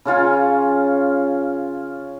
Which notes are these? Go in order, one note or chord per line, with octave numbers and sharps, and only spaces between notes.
C#3 C#4 F4 G#5